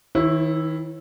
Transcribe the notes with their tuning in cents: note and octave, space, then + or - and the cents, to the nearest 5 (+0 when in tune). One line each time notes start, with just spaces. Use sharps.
D#3 +35 E4 +0 C#5 -40